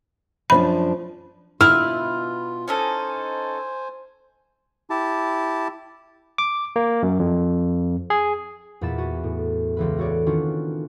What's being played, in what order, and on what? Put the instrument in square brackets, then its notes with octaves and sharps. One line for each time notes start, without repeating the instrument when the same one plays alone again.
[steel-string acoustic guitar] F#2 F3 D4 [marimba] B5
[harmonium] B2 F4 [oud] E4 [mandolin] B4 [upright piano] F6
[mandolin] C#4 D#4 A4 [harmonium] C5 G#5
[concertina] E4 G4 A5
[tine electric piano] D6
A#3
F#2
F2
G#4
[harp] E2 A#2 F#5 B5 A6 E7
F#4 G#5 A6
A2
C#2 E3 B4
F#4 A4 C#5 D5
D#3 C#4 D4 F4 F#4